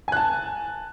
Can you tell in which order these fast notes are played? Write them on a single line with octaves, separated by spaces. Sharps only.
G#5 F#6 A5